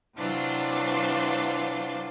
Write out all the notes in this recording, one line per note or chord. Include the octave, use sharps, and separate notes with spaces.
C3 E3 F#3 D4 F4 C5